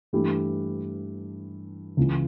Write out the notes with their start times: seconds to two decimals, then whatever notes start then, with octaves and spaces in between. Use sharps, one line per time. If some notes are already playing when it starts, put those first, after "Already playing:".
0.13 G2 E3 A3 E4 G4
1.97 C#2 C#3 E3